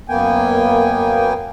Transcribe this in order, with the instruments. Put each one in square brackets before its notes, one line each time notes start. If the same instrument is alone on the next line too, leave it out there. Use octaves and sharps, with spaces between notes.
[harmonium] F#2 A#3 B3 G5 G#5